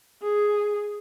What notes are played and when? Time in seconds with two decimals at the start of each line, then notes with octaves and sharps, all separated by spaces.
0.23 G#4